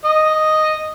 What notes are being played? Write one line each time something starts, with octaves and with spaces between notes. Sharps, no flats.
D#5